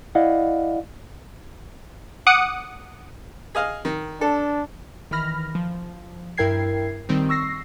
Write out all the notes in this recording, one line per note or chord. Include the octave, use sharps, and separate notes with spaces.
E4 D5 D#5 F5 F#5
F#5 D6 D#6 C#7
G#4 D#5 F5
D#3
D4 A4
D#3 E3 B5 F6 A#6
F3
G2 E4 A#4 G5 G#6 C7
D#3 G3 C4 D#4
C#6 E6 A#6 C7